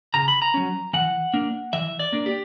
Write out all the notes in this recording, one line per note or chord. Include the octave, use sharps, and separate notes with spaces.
C#3 A#5
B5
A#5
F#3 C#4
E3 F#5
A#3 D4
E3 E5
D5
A#3 D4
G4